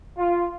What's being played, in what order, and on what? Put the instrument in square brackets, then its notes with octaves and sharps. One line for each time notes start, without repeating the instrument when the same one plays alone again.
[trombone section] F4